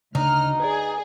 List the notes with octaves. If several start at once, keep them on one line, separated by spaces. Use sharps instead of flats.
D2 C#3 D4 D#4 F6
G#4 B4 D5